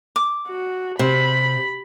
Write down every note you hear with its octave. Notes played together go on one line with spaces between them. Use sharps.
D6
F#4
C3 C5 B5